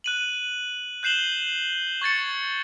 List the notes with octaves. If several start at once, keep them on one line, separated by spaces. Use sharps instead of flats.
F#6 D#7 F#7
F#6 G6 C7 E7 F#7 G7
C#6 G#6 A6 C#7